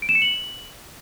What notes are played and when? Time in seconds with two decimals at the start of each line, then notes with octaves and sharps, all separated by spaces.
0.02 D7
0.09 E7
0.15 C#7
0.22 F#7